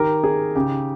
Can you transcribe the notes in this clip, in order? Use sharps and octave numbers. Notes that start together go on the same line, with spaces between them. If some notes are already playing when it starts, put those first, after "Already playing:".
Already playing: D#3 G4 A#4
D#4 G#4
C#3 G4